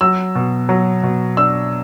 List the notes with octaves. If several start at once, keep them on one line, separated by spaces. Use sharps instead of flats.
F#3 E6
B2
F#3
B2
D4 E6